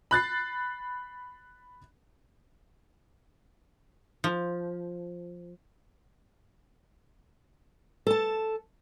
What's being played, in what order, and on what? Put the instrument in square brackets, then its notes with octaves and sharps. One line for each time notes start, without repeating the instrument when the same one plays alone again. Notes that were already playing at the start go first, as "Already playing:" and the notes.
[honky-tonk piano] B5 F#6 A6 C7
[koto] F3
[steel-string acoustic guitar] A4 A5